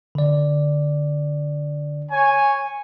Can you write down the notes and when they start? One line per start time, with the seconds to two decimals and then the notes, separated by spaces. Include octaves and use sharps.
0.15 D3 D5
2.11 C#5 G#5